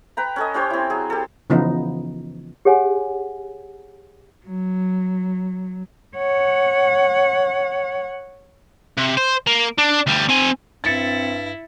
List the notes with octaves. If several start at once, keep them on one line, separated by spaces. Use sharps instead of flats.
B4 G5 A#5
C#4 A4 D#5
C#4 G4 C5 C#5
C4 E4
F#3 G#4
G4 A4
C#3 E3 F3 B3 D#4
G4 G#4 C#5 F#5 G#5
F#3
C#5 F#5
C3
C5
A#3
D4
D2 G3
C4 G#5
G2 C4 E4 A6 C#7